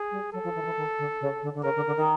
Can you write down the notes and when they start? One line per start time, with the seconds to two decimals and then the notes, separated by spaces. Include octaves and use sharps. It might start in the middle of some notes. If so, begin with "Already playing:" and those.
Already playing: G#4
0.11 G3
0.33 F#3 A4
0.44 F3
0.55 E3
0.62 D#3
0.65 E3
0.76 D#3
0.98 D3
1.20 C#3
1.42 D3
1.54 D3
1.64 C#3 A#4
1.75 D3
1.86 D3
1.97 D#3